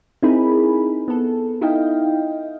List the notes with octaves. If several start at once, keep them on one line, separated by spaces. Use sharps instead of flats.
C4 D#4 E4 G#4 A#4 B5
B3 A4
D#4 E4 D#5 F5 G5